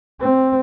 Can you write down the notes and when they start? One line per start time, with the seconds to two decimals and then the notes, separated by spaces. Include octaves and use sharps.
0.20 C4